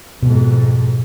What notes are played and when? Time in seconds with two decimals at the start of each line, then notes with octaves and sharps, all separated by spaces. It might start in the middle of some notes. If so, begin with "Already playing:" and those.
0.23 F2 G#2 B2